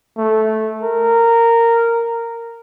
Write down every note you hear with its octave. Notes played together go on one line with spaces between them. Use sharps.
A3
A#4